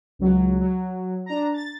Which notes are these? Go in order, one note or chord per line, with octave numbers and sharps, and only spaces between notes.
C#2 F#3
F#3
D4 A#5
A6